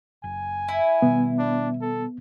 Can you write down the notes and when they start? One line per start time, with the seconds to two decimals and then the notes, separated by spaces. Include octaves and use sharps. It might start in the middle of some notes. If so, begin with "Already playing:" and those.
0.24 F#1 G#5
0.68 E4
1.02 B2 D#3 G3 B3
1.39 D4
1.81 A4